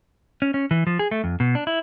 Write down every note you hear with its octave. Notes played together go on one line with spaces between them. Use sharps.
C#4
C#4
E3
F3
G#4
A3
F2
B2
D4
E4